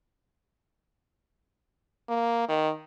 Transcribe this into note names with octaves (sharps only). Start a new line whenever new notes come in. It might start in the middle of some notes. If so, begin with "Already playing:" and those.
A#3
D#3